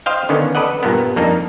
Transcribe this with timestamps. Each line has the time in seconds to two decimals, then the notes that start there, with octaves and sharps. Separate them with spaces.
0.06 C5 D#5 F5 G5
0.29 D3 D#3 B3 C#4
0.55 A4 B4 D5 D#5 F#5
0.83 G2 A#2 A#3 B3
1.16 F2 A#3 D4 D#4